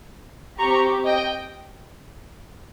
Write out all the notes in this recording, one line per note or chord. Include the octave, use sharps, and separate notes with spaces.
C4 G4 A#5 C#6
D#5 G5